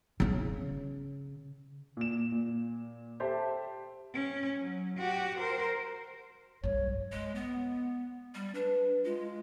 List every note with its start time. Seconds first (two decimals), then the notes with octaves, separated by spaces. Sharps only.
0.20 C#3 C#4
1.97 A#2 E7
2.32 A#2
3.20 G4 A4 C5 E5 A5
4.13 C#4
4.60 F#3
4.97 F#4 G4
5.38 A#4 C5
6.64 B1 G2 C#5
7.12 G#3
7.35 B3
8.35 G3
8.55 D4 B4
9.05 G#3 F4